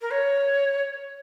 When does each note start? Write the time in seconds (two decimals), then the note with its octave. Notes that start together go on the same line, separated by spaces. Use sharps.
0.01 A#4
0.11 C#5